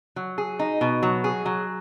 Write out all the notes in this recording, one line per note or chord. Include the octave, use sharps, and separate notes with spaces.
F#3
G#4
D#4
B2
F#3
G#4
F#3